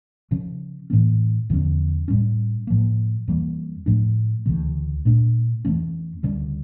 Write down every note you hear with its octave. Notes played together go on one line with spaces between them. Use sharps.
C#3 F3 C#4
A2 E3 A#3 C#4
E2 D3 F3 C#4
A2 G3 C#4
A2 F3 A#3
F2 E3 G3 A#3
A2 F3 A3 D4
D2 C#3 E3 A#3
A#2 A3 D4
F2 E3 A3 C#4
D2 C#3 G3 C#4